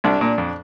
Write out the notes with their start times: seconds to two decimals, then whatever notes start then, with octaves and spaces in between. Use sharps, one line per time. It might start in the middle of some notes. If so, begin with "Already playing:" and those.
0.04 C2 D4
0.21 A#2
0.38 F2